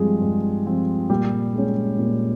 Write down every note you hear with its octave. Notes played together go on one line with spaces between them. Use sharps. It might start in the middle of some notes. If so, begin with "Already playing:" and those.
Already playing: G2 F3 G3 G#3 C4 G#4
G2
F3 C4
A#2 G3 G4
G#3 C#4
A#2